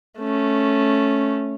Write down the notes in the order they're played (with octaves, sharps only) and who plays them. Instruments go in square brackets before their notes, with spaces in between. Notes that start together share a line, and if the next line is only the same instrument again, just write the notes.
[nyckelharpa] A3 C#4